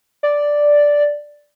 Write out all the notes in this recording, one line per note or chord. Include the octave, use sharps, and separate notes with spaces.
D5